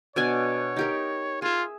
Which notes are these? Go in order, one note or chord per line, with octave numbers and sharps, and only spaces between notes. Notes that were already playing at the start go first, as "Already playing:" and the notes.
B2 D4 C#5 G#5
D#4 G4 A#4
F4 G#4 E5